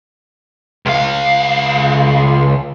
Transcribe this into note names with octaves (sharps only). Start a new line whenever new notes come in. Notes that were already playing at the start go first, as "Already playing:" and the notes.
C#2 F5